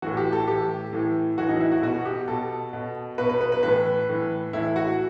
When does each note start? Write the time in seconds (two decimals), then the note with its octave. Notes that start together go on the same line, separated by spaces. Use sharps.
0.02 A2 E3 F#4
0.17 G4
0.33 A4
0.48 A2 E3 G4
0.93 A2 E3
1.38 A2 E3 F#4
1.49 D#4
1.61 E4
1.72 F#4
1.83 B2 F#4
2.05 G4
2.28 B2 A4
2.73 B2
3.18 B2 B4
3.29 B4
3.41 B4
3.52 B4
3.63 A2 E3 B4
4.09 A2 E3
4.53 A2 E3 E4
4.76 F#4